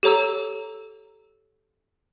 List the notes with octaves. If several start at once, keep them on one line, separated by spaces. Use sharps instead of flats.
G4 A4 C#5 A#5 E6